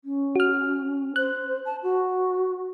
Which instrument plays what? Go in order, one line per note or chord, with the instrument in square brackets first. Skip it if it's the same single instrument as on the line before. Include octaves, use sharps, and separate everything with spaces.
[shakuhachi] C#4
[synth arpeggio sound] F#4 F6
[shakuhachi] C5 [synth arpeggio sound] F#6
[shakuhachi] A5
F#4